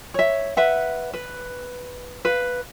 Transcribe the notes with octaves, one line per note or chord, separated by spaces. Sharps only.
C#5 E5
B4 E5 F#5
B4
B4 F5